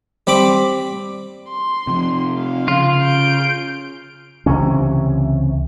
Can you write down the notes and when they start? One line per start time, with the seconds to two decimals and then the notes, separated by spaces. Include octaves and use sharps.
0.27 G3 C4 B5 D6
1.50 C6
1.87 C3 F3
2.38 F5
2.68 C#3 F4
3.03 G6 D7
4.46 C#2 C3 E3 C#4